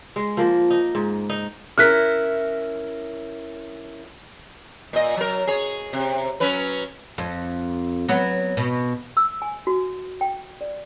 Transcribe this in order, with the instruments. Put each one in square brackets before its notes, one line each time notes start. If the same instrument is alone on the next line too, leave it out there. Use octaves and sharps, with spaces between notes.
[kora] G#3
F3 A#3
D#4
G#2
D#4
[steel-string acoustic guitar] C#4 E4 A#4 [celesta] F6 F#6 B6
[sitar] A#2 D#5
F#3 A#4
G#4 C#5
C3
F#3 C#4 B4
[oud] F2
F#3 B3
B2
[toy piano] E6
G#5
F#4
G5
D5